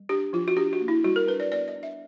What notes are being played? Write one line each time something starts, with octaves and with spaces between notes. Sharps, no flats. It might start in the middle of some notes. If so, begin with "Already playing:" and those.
Already playing: G3
D4 G4
F3 F4
F#4
D4 G4
F#4
A#3
E4
G3 F#4
A#4
D4 B4
D5
B3 D5
D#5
D4
E5